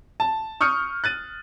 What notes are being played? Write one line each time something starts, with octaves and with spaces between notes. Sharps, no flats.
A5
C#6 D#6 F6 G6 C#7
F#6 A6 D#7